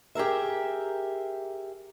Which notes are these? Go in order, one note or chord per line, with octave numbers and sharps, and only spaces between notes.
G4 G#4 A#4 E5